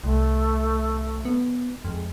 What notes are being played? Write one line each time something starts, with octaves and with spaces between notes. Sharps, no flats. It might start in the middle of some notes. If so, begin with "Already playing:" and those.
C2 A3
B3
F2 G#3